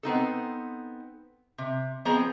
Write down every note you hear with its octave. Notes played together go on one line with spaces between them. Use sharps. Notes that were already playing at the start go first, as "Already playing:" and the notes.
B3 C4 D#4 A4
C3
F3 B3 C4 G#4 A#5